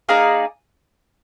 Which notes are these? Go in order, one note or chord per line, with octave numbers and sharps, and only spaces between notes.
A#3 D#4 G#4 D5